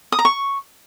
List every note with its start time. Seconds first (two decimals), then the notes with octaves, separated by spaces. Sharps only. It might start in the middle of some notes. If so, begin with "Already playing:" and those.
0.12 D#6
0.19 A#5
0.25 C#6